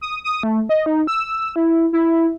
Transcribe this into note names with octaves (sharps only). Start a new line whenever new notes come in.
D#6
D#6
A3
D#5
D#4
E6
E4
E4